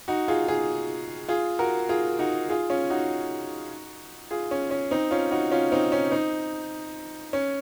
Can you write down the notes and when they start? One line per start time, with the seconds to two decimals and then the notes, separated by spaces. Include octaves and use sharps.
0.08 D#4 F#4
0.28 F4 G#4
0.48 F4 G#4
1.28 F4 G#4
1.59 F#4 A#4
1.89 F4 G#4
2.19 D#4 F#4
2.49 F4 G#4
2.70 C#4 F4
2.90 D#4 F#4
4.31 F4 G#4
4.51 C#4
4.71 C#4
4.91 C4 D#4
5.11 C#4 F4
5.31 D#4 F#4
5.51 C#4 F4
5.72 C4 D#4
5.92 C#4
6.11 C4 D#4
7.33 C#4